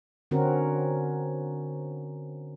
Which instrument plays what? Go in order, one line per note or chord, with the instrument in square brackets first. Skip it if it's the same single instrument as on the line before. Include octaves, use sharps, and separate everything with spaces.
[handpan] D3 C4 C#4 F#4 A#4